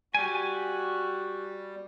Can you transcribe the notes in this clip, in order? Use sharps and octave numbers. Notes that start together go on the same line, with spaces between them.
G3 F#4 G4 G#5